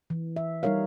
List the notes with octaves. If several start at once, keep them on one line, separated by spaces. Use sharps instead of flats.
E3
E5
G3 D#4 A#4 C#5 F5